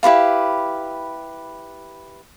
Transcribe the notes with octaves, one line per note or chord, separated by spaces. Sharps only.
E4 G4 B4 F5